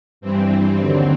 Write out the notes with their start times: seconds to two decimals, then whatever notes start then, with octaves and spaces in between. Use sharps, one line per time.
0.21 G2 E3 G3 C4
0.77 D#2 D3 F#3 C4